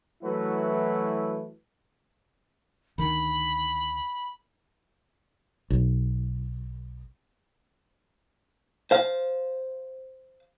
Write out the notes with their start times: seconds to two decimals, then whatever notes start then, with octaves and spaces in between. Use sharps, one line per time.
0.23 E3 F#3 A3 E4 F#4 B4
2.98 D2 D#3 B5
5.70 B1
8.91 C5 F5